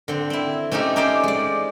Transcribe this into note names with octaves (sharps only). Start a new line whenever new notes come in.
D3 C4
C4 E4
A3 C4 C#4 D#4 G4
C#4 D#4 G4 C5 D5
G#3 D5